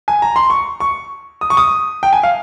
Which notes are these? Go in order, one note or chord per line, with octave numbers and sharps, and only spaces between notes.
G#5
A#5
C6
C#6
C#6
D#6
C#6
D#6
G5
G#5
F5